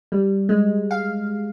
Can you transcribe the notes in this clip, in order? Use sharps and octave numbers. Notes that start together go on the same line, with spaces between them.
G3
G#3
F5